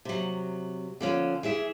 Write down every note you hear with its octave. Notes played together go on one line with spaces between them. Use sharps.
C3 F#3
D3 F3 C#4
E3 G#4 E5